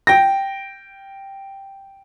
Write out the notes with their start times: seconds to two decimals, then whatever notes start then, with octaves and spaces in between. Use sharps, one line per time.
0.07 G5 A#6